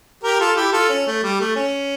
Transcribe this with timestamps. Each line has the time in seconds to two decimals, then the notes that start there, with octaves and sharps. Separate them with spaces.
0.24 G4 A#4
0.40 F4 A4
0.56 E4 G4
0.73 F4 A4
0.89 C#4
1.07 A3
1.23 G3
1.40 A3
1.56 C#4